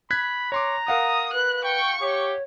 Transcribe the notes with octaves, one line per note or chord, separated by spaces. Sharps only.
B5 F#6 G#6 B6
C#5 A#5 C6 D6
A#4 F5 F#5 D#6
B4 F#6
G5 C#6
G4 C#5